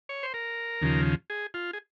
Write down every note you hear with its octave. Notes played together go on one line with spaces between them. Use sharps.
C#5
C5
A#4
D#2 C#3 F3
G#4
F4
G#4